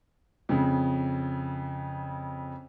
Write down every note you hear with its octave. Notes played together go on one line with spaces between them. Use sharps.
F2 C#3